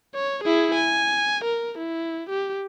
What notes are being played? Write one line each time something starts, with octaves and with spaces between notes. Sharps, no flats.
C#5
E4 G#4
G#5
A#4
E4
G4